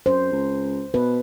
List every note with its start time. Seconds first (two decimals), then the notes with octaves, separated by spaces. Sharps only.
0.06 F#2 C5
0.32 C#2
0.94 B2 B4